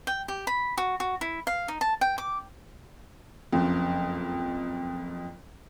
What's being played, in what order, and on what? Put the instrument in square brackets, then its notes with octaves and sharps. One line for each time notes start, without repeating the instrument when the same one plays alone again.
[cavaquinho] G5
G4
B5
F#4
F#4
E4
F5
D#4
A5
G5
D6
[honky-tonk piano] F#1 F2